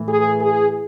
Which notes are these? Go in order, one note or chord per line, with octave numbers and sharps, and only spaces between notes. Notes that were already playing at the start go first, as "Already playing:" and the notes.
Already playing: A2 E3
G#4
G#4